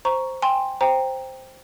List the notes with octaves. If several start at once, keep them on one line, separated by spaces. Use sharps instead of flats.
C5 A#5 C#6
G5 G#5 C6
C5 G5 A#5